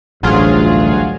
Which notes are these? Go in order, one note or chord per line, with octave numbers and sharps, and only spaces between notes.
A1 D2 G2 F#3 F4 G#4